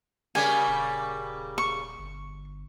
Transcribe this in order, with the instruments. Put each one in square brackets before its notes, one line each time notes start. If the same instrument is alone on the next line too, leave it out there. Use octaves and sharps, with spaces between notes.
[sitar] C#3 G3 A#3 [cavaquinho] G#5
[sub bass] D#1
[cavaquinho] C#6
[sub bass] G1